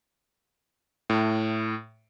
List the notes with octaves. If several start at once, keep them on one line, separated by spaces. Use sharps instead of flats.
A2